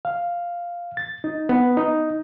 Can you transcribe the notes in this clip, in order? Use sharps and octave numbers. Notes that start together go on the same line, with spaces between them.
F5
A6
D#4
B3
D#4